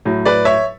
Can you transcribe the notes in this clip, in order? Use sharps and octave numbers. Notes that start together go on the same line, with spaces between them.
A2 F#3
B4 D5
C#5 E5